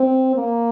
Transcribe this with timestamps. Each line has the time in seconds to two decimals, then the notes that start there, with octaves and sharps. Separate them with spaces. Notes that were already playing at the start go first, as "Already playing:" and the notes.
Already playing: C4
0.35 A#3